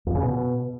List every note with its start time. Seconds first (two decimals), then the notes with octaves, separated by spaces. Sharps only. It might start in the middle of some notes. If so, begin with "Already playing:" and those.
0.07 F2
0.15 C#3
0.23 B2